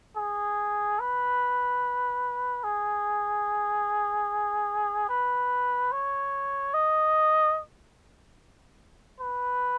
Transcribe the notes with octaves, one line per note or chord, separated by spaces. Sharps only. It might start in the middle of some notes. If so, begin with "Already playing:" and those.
G#4
B4
G#4
B4
C#5
D#5
B4